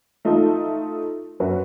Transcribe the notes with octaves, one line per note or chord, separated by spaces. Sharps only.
A3 D#4 F4 A4
F#2 F#4 B4